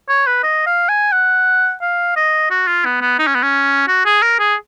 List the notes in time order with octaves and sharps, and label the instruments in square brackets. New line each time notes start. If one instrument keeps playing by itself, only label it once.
[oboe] C#5
B4
D#5
F5
G#5
F#5
F5
D#5
F#4
F4
B3
B3
D#4
C#4
B3
C#4
F#4
G#4
A#4
G#4